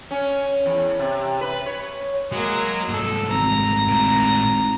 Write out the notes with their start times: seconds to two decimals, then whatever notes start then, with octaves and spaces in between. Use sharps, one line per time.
0.11 C#4
0.66 E2
0.99 C3
1.41 B4
1.66 C#5
2.32 F#3 G#3 A#3
2.89 C2 G#2 A4
3.32 G#1 A#5
3.88 A2 A#4